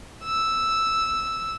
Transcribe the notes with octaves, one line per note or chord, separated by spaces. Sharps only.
E6